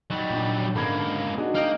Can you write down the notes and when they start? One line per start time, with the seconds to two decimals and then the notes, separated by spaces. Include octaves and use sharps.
0.11 F#3 G3 D#4
0.30 A#2 D4
0.75 C#2 G#2 D3 A#3 B5 G#6
1.38 D4 D#4 F#4 G#4
1.55 A#3 D#4 D#5 G5 F6